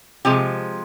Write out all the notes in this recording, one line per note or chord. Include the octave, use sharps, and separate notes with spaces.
C3 F3 G#3 G4